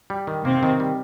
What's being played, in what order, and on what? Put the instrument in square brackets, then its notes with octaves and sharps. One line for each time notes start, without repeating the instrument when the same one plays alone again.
[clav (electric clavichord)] G3
D#3
[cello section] C3 C4 [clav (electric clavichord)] A#3
[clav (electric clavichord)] D#3
G3